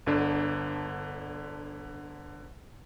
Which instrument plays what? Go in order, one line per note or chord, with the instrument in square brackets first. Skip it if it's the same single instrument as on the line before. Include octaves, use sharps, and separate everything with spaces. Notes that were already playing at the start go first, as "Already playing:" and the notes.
[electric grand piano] G1 D3 D4